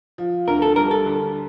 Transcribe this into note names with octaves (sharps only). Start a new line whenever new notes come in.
F3
D2 A#4
A4
G3 A#4
A4
D3